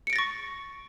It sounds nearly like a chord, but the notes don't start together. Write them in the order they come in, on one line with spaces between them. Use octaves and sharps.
C#7 D7 A#6 A6 C#6